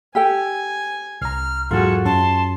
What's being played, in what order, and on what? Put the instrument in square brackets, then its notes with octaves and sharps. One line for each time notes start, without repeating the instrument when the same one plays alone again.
[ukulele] G4 A4 G5 [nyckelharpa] G#5
[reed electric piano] C2 A#5 [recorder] F6
[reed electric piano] E2 G#2 F#3 [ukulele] F4 [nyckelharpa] F#4 G#4 [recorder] A4
[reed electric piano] F#2 C#4 [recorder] A5 [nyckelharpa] C6